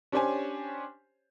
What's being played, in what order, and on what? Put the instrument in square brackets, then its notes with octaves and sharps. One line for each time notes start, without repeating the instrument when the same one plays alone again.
[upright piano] C#4 D4 G4 C5 C#5 G#5